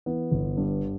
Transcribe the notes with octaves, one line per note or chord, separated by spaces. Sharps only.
E3 B3
G1
G2